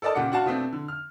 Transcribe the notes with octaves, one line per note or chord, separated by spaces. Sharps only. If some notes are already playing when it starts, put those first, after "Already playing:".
A4 A#4 D5 D#5 A5
A#2 C#3 G4 F#5 D6 C#7
D4 F#4 F5 A5
B2 A3 C4 D4
D3
F6